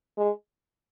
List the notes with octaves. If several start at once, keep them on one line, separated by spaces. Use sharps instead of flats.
G#3